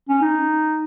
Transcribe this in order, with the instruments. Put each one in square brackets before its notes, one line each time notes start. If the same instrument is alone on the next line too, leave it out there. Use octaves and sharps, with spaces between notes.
[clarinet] C#4
D#4